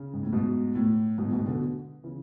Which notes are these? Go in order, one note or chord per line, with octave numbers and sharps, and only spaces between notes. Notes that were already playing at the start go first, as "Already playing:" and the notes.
Already playing: C#3
G#2
A2
G#2 B2
A2
G#2 B2
A2
G#2 B2
B2 D3
C#3 E3